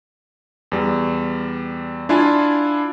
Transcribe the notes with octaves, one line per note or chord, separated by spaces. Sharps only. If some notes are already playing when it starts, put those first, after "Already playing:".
E2 G3
D4 E4 F4 F5 G#5